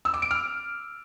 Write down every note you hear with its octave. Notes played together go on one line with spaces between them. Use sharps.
E6
D6
D7
F6